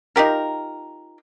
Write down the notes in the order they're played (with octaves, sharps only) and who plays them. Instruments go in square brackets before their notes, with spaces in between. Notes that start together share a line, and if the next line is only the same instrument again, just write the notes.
[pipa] D#4 F4 G4 A#4